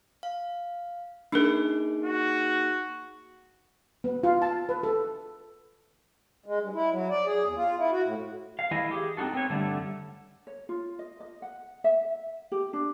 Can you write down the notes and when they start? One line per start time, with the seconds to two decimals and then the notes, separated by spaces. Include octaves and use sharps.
0.23 F5
1.32 A#3 D4 D#4 G#4 A#4
2.05 F#4
4.04 B3
4.23 F4
4.42 A5
4.69 B4
4.83 A4
6.46 G#3
6.60 G2
6.74 E4
6.91 F#3
7.10 D5
7.26 G#4
7.44 E2
7.56 F4
7.78 E4
7.91 F#4
8.04 A2
8.59 F5
8.71 E3 A3 E4 D#5 F5 G#5
8.91 G4 G#4
9.17 C4 D#4 F4 F#4 A4
9.34 C4 B4 C#5
9.50 G2 D3 G3 A3
10.47 C#5
10.69 F4
10.99 D#5
11.20 D#5
11.42 F#5
11.84 E5
12.52 G4
12.73 D4